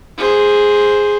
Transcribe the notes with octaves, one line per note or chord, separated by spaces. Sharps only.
G#4 C5